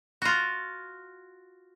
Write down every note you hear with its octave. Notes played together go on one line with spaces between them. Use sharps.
F4 F#4